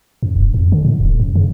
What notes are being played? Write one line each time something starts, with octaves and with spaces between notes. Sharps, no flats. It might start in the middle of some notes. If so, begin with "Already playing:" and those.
F#2
E1
F2
D3
A2
D1
F#2
C#3